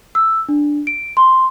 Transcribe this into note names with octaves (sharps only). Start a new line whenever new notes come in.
E6
D4
D7
C6